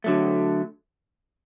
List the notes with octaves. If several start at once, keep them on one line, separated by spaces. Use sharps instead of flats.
D3 F#3 A3